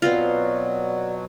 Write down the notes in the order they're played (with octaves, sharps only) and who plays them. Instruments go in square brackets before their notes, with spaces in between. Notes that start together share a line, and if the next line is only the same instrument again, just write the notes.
[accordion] B2 F#3 [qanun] B3 C4 F4 [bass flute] D5